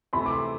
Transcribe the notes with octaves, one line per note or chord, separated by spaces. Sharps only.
C3 E3 A3 B5
D6
C6